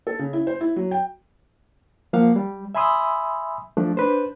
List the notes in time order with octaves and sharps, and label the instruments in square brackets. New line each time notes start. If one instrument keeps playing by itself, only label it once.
[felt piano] A4
C#3
E4
C5
E4
F#3
G5
[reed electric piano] F3 A#3 F5 F#5
G3
E5 G#5 B5 C6 D#6 E6
F3 A3 D4
D4 B4 C5